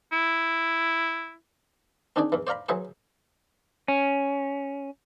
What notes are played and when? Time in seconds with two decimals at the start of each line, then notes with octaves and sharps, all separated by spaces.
0.12 E4
2.16 C4 D4 D#4 G#4 D5
2.32 E2 E3
2.47 C5 D5 F5 A#5 B5
2.69 E3 F#3 G#4 B4 C5
3.88 C#4